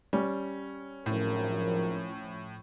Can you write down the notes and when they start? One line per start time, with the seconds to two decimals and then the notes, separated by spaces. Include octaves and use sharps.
0.13 G3 C#4
1.06 G#1 F#2 A2 F3 C#4 A#4